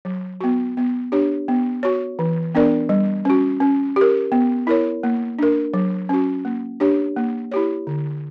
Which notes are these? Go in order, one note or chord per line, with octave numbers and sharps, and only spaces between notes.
F#3
B3 F#4
B3
D4 G4 C#5
B3
F#4 C#5
E3
B3 D4 A#4 D5
G3
C#4 F#4
C#4
G4 A#4
B3
E4 A#4 C#5
A#3
D4 A#4
F#3
C#4 F#4
A#3
D4 G4 C#5
A#3
E4 G4 C#5
D3